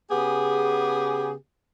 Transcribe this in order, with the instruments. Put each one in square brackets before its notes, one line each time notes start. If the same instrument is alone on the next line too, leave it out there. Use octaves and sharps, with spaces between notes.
[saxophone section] C#3 B3 G4 G#4